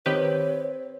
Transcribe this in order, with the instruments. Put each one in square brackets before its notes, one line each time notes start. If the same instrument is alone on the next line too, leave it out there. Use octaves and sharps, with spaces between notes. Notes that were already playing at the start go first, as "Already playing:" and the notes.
[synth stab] D#3 G4 B4 [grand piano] C4 [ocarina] C#5